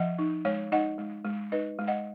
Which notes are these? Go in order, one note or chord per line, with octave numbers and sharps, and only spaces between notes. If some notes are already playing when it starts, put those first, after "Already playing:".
Already playing: F3 D#5 F#5
D#4
G#3 C#5 F5
D#4 D#5 F#5
G#3
G#3
D#4 B4 D#5
G#3
D#5 F#5